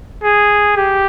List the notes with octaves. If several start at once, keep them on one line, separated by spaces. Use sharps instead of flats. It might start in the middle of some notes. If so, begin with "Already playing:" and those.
G#4
G4